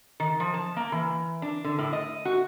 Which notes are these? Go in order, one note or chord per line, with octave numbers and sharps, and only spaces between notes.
D#3
F3
A5
A#3
E3
D4
D3
A2
D#5
F#4